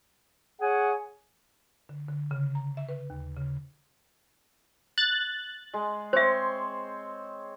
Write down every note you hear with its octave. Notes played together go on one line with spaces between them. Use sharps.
G#4 C#5 F#5 G#5
D3
D3
C#3
A#5
E5
B4
D#2
C#3
F#6 A6
G#3
C4 C5 C#5 E5 C6